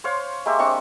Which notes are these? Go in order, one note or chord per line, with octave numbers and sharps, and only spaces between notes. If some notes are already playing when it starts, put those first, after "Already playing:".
C5 C#5 F5
G#3 A#3 G4 E5
G#3 C4 D4 C#6